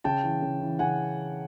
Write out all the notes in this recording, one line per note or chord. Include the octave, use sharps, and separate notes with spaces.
C#3 G5 A5
E3
C#3
E3
C#3 F#5 G#5